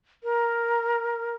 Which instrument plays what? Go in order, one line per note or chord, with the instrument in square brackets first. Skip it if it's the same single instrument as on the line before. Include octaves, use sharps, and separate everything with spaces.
[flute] A#4